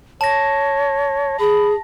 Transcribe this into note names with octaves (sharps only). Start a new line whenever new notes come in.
C#5 A5 A#6
G#4 B5